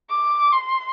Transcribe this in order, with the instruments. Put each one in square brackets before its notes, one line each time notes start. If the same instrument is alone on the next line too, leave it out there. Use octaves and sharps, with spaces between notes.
[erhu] D6
C6